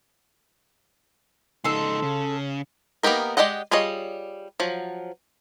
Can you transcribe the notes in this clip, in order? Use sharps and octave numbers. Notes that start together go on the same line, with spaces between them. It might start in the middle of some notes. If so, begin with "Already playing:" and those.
C#2 D#4 A4 C6
C#3
A#3 B3 D#4 G4 A#4
G#3 G4 D5 D#5 F#5
G3 F4 G#4 C#5 D#5
F3 F#3